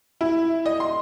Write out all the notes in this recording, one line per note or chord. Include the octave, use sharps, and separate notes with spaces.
E4
D#5
C6